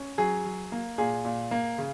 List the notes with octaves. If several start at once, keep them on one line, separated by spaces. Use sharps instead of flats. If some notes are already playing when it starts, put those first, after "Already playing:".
Already playing: C#4
F#3 G#4
F#3
A#3
A#2 G#4
A#2
A#3
C#3